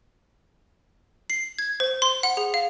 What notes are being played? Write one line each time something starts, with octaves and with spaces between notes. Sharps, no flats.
C7
G#6
C5
C6
F#5
G#4
F5